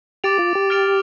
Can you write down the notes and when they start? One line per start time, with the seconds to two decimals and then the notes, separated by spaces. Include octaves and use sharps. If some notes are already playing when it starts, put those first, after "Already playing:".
0.24 G4 D6 A6 D7 F7
0.39 F4
0.55 G4
0.70 F6 A6 D7 F7